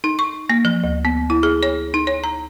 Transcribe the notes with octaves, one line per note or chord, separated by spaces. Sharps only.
D#4
C#6
A#3
F3
D2
B3
E4
G#4
C#5
D#4
C#5
A#5